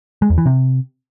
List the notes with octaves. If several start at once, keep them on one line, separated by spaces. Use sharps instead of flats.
G#3
E2
E3
C3